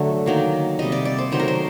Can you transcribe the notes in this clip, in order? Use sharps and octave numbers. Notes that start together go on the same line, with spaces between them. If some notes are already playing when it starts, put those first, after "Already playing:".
Already playing: D3 F#3 A3
D#3 F#3 A#3
C3 G3 A#3 D#5
D5
D5
C5
D#3 F#3 A3 C5
A#4
C5